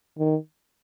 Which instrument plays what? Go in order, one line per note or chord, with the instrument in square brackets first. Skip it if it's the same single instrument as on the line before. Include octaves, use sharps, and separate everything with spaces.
[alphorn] D#3